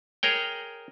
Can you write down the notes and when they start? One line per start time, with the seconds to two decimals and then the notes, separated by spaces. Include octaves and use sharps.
0.23 G#4 A#4 C#5 G5